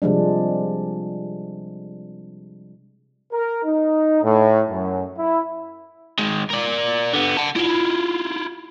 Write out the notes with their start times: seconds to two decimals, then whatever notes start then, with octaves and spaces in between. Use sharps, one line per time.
0.02 C3 F3 G3 G#3 D4
3.32 A#4
3.64 D#4
4.22 A2
4.70 F#2
5.18 E4
6.19 D#3 G#3
6.50 A#4 D5
7.13 D3 B3
7.37 F#5 A5
7.56 E4 F4